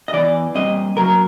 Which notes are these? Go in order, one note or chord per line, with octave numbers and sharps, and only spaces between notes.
D#5
E2 C3 E3 D5
A#2 G3 C4 D#5
C#3 F#3 A#3 A#4